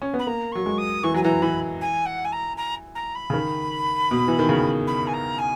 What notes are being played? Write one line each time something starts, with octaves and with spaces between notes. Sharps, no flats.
C#4
B3
B5
A#3 A#5
F#3 C#6
G#3
D#6
E3 C#6
F#3 G#5
E3 A#5
E3 B5
G#5
F#5
G#5
A#5
A#5
A#5
B5
C#3
D#3
B2
E3
D#3
C#3
B5
G#5
A#5
G#5